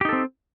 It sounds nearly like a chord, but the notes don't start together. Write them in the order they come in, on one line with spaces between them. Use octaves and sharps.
G4 D#4 A4 C4